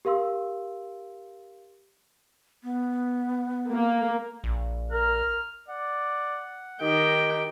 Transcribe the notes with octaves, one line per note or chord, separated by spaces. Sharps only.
G4 A#4 F5 C6 E6
B3
A#3
A#1
A#4 F6
D5 F#5
D#3 D#4 G4 D#5 G5